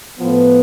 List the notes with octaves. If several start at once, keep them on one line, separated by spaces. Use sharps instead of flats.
A2 F3 B3